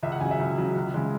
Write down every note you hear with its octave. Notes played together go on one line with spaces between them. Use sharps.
C#2 E5
F#5
C#3 F#3 G#5
E5
C#2
C#3 F#3
C#2
C#3 G#3